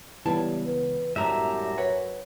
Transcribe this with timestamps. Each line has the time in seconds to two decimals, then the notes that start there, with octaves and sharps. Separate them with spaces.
0.26 C#2 E3 G3 B3 E4 A5
0.66 B4
1.16 F#2 A2 G3 G#3 E5 A#5
1.78 B4 C#5 F#5